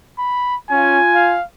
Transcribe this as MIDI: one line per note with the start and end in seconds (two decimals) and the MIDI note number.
0.18 0.56 83
0.71 0.99 61
0.71 1.37 65
0.71 1.37 80
1.15 1.43 77